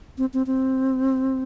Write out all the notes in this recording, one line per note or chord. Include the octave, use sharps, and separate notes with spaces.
C4
C4
C4